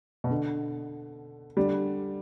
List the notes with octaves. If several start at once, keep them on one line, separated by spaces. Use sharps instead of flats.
B2
D3
D3 G3